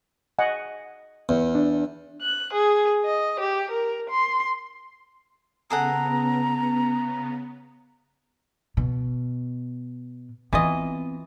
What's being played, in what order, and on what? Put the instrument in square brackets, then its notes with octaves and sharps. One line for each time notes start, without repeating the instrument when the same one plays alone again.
[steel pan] D#5 F#5 G#5
[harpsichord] E2
[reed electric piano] D4
[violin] F#6
G#4
D#5
G4
A#4
C6
[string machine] C#3 B3 [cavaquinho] G#4 A4 F#5 [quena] A#5
[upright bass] B2
[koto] E3 F4 D#5 [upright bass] B3 C4